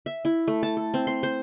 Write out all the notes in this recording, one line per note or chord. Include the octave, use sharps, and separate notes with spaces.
E5
E4
A3
A5
A4
C4
C6
C5